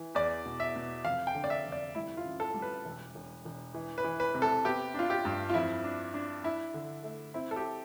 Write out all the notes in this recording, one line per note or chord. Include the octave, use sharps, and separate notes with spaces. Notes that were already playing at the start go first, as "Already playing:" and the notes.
Already playing: E3
E2 D5
B2
E5
B2
F1 F5
G5
D3
D5
E5
F1
D5
G3 E4
F4
A1
A4
G3
B4
E1
E1
E1
E3
B4
E3
B4
C3
A4
B3 G4
D4 F4
G4
G2
F4
F2 E4
D4
D4
D4 E4
D3
A3
C4 E4
A4
G4